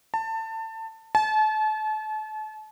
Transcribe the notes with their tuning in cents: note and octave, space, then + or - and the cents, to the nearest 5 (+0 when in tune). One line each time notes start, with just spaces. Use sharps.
A5 +25
A5 -40